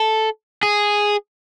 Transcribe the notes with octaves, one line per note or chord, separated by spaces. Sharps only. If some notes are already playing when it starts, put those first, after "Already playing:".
Already playing: A4
G#4